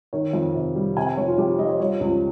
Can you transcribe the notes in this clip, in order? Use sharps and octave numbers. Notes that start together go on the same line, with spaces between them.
D#3 C#5
F2
C3
G3
C3 G#5
G#5
F1 C#5
F4
F2 G4
F3 D#5
C#5
G3 C#5
C#2